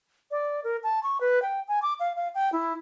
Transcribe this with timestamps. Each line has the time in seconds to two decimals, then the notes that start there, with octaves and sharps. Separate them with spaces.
0.31 D5
0.64 A#4
0.83 A5
1.03 C#6
1.21 B4
1.42 G5
1.68 G#5
1.82 D6
2.00 F5
2.16 F5
2.35 G5
2.52 E4